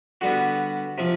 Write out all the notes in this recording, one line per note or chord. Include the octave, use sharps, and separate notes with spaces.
D3 G3 B3 F#4
C3 F3